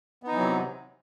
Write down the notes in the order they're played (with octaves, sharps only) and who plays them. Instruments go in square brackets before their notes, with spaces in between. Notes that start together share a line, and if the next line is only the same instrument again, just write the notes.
[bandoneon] B3
D#4
E3
F#3
C3